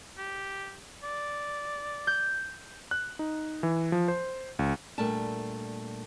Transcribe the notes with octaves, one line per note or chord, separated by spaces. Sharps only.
G4
D5
G6
F#6
D#4
E3
F3
C5
C#2
A#2 G3 A3 A#3 D4 A5